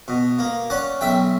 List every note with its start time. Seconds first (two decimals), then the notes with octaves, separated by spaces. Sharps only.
0.08 B2
0.39 A#3
0.70 C#4 D5 F#5
1.01 B1 E5 G5